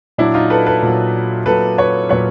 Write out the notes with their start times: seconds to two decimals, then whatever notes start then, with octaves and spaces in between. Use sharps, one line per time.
0.18 A#2 F#3 D4 E4
0.34 D#4 F4
0.50 A4 B4
0.66 A4 B4
0.83 A#2 F#3
1.46 A#2 F#3 A4 B4
1.78 B4 C#5
2.09 A#2 F#3 B4 C#5